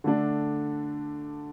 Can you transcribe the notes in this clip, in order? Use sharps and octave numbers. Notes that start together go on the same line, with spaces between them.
D3 A3 D4